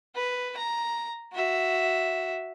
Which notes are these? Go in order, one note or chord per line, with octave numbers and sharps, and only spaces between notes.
B4
A#5
F#4 E5